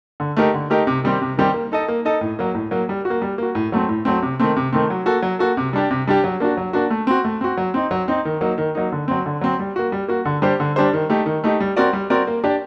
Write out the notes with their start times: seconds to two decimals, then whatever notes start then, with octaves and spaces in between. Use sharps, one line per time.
0.20 D3
0.37 A3 D#4 G4 A#4
0.54 D3
0.70 A3 D#4 G4 A#4
0.87 C3
1.04 D#3 G3 C4 G4
1.22 C3
1.37 D#3 G3 C4 G4
1.54 A#3
1.72 D#4 A4 D#5
1.88 A#3
2.05 D#4 A4 D#5
2.21 A2
2.39 F#3 A#3
2.55 A2
2.71 F#3 A#3
2.89 G3
3.05 F#4
3.10 A#3
3.22 G3
3.38 A#3 F#4
3.55 A2
3.72 F#3 A3 C4
3.89 A2
4.05 F#3 A3 C4
4.22 C3
4.40 D#3 A3 C4
4.56 C3
4.73 D#3 A3 C4
4.90 F#3
5.06 A#3 F#4 A4
5.22 F#3
5.39 A#3 F#4 A4
5.57 C3
5.73 G3 D4 G4
5.91 C3
6.07 G3 D4 G4
6.24 F#3
6.40 A#3 D4 F#4
6.57 F#3
6.73 A#3 D4 F#4
6.90 A3
7.07 C4 F#4
7.25 A3
7.41 C4 F#4
7.57 F#3
7.74 C4 D#4
7.91 F#3
8.08 C4 D#4
8.25 D#3
8.41 F#3 A#3 D#4
8.58 D#3
8.75 F#3 A#3 D#4
8.92 D3
9.08 F#3 C4
9.26 D3
9.41 F#3 C4
9.59 G3
9.76 A#3 F#4
9.92 G3
10.08 A#3 F#4
10.25 D3
10.42 G3 D4 G4 C5
10.60 D3
10.76 G3 D4 G4 C5
10.93 D#3
11.10 A3 D#4 G4
11.26 D#3
11.44 A3 D#4 G4
11.60 G3
11.76 C4 F#4 A#4 D5
11.93 G3
12.10 C4 F#4 A#4 D5
12.27 A#3
12.44 D4 G4 D5